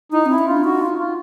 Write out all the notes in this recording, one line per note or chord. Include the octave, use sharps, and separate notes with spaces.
D#4 E4
C4 E4
C#4
D4 F4
D#4 F#4
F4
F4